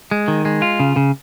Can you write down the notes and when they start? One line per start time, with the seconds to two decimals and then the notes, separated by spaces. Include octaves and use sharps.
0.11 G#3
0.28 D#3
0.45 G#3
0.62 F4
0.80 C#3
0.96 C#3